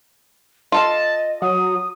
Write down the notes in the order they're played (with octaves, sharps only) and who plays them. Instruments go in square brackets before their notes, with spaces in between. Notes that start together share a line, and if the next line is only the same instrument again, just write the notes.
[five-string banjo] F4 A4 F5 [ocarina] D#5 [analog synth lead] A5
[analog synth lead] F#3 [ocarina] D#6